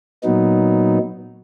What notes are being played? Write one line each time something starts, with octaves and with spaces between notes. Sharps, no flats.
A#2 F#3 B3 D#4